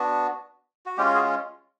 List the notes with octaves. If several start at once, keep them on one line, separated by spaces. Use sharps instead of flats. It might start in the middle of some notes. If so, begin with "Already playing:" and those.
Already playing: B3 D4 F#4
F#4
G#3 C#4 F4 G4
F#4 G#4